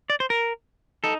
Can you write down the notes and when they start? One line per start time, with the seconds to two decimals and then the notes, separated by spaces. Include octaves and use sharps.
0.10 D5
0.20 C5
0.30 A#4
1.04 D#4 A4